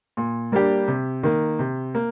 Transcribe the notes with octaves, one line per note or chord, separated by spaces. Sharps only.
A#2
G3 A#3 D4 G4
C3
D#3 A#3
C3
A#3